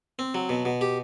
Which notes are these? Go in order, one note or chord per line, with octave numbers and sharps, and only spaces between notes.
C4
F#3
B2
B2
G4